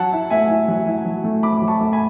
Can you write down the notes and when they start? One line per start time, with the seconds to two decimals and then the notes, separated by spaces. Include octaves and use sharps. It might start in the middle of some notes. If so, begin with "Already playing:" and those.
Already playing: F#3 F#5 A5
0.12 E4
0.30 A3 E5 G#5
0.49 E4
0.68 F#3
0.87 E4
1.05 F#3
1.24 A3
1.43 A3 B5 D6
1.62 F#3
1.68 A5 C#6
1.81 A3
1.92 G#5 B5